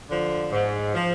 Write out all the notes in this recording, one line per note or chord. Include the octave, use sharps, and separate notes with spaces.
D3 F3
G#2
F3